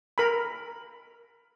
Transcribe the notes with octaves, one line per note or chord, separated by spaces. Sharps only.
A#4 B5